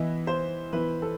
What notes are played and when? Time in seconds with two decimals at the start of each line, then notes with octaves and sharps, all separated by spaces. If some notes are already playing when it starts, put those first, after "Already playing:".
Already playing: E3 B3 E4 D#5
0.27 C5
0.73 E3 B3 E4 B4
1.02 A4